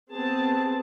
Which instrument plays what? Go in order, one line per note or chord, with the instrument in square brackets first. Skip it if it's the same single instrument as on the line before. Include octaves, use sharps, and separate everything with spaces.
[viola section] B3 C4 G#4 A5